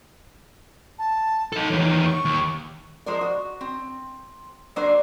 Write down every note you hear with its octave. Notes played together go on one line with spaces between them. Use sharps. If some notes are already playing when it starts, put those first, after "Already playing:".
A5
D#4 A4
E2 D#3 C#5
C#6
D#2
F3 G#3 A#4 C5 D5
F#4
C4
F#3 A#3 D4 A#4 C5 D5